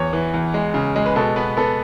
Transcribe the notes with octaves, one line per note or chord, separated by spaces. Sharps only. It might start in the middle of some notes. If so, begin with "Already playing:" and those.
Already playing: E2 C#5
E3
E2
G#3
C#3
G#3
B4
B2 A4
B3 B4
B3 A4